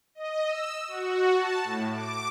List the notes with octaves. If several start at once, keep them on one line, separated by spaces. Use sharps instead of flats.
D#5
E6
F#4
A5
A2
D6